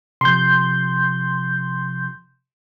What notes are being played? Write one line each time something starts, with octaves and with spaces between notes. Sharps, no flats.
C3 F3 C6 G6